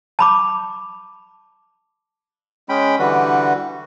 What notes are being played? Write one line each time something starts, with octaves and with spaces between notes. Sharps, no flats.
A5 B5 D6
G#3 C#4 G5 B5
D3 E3 G3 F#4 B4